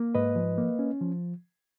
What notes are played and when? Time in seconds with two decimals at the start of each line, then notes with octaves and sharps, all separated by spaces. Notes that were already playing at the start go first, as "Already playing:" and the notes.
Already playing: A#3
0.15 G#2 B4 D#5
0.36 F3
0.58 A#3
0.79 C#4
1.01 F3